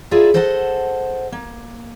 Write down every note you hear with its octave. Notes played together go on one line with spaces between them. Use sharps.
E4 F4 G#4 A#4 D5 E5
A4 C5 D#5 F#5 G#5 A5
A#3